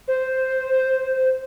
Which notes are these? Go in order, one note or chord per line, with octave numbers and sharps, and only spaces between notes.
C5